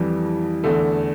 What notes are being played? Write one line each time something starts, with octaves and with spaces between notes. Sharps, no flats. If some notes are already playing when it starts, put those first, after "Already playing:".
Already playing: F2 E3 G3
E2 D3 A3